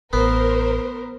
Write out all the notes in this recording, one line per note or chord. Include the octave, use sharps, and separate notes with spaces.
A1 B3 A#4 C5